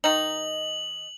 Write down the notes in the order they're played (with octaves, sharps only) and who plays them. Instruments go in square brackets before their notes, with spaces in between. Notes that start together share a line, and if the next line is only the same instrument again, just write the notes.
[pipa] D#3 D#4 [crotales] F#7